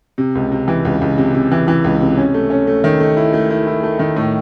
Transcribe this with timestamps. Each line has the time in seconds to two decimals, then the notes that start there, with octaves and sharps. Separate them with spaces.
0.18 C3
0.35 C#2
0.52 C3
0.68 E3
0.85 C#2
1.01 C#2
1.18 C3
1.34 C3
1.51 E3
1.68 E3
1.84 C#2
2.01 C3
2.18 C#4
2.34 A3
2.50 C#4
2.67 A3
2.84 D#3
3.00 A3
3.17 E4
3.33 A3
3.50 E4
3.67 E4
3.83 A3
3.99 D#3
4.16 A2